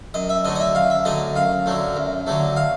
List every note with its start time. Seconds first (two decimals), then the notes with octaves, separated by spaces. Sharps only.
0.14 F#2 D#5
0.30 E5
0.45 D3 F#3 A3 D#5
0.56 D#5
0.60 E5
0.75 F#2 F5
0.90 E5
1.05 D3 F#3 A3 D#5
1.36 F#2 F5
1.66 D3 F#3 A3
1.96 F#2
2.27 D3 F#3 A3
2.56 F5